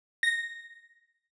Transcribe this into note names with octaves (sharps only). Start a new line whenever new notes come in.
A#6